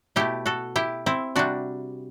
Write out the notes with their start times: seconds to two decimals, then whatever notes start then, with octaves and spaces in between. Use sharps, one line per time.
0.16 B2 A3 E4 G4
0.46 F#4 A4
0.76 E4 G4
1.06 C4 E4
1.36 C3 G3 D4 F#4